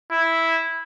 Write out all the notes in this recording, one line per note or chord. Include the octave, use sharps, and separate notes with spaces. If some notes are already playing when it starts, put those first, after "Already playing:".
E4